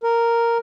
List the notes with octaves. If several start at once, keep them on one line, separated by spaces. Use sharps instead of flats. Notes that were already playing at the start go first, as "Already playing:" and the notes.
A#4